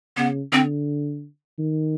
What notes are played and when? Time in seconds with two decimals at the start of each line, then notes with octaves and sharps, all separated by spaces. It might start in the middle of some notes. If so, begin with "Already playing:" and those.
0.17 C#3 B3
0.52 D3 C4
1.59 D#3